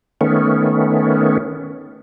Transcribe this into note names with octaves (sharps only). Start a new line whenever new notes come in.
D#3 A3 B3 C#4